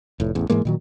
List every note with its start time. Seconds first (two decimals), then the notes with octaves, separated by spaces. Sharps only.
0.20 F1 A2
0.35 A1 E2
0.50 G#2 E3 G#3 A#3
0.65 A#2 D#3 F#3